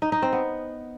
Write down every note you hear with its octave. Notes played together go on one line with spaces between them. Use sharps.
D#4
D#4
C4
B3